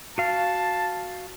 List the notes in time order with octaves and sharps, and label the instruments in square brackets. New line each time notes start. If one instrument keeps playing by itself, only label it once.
[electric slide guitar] F#4 F5 [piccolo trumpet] A5